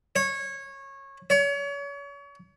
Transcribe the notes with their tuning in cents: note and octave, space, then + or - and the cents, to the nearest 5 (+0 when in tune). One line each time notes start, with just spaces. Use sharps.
C#5 -20
C#5 +35